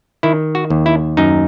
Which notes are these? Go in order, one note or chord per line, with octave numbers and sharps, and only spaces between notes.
D#3 E4
F#4
D#2
E4
F#2 D#4